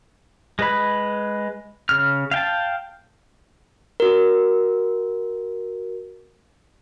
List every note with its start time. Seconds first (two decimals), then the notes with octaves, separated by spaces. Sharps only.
0.59 G#3 B4 B5
1.89 C#3 F6
2.31 F5 G5 A5
4.00 F#4 A#4